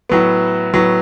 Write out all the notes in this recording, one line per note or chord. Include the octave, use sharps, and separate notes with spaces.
A2 F#3 B3
A2 F#3 B3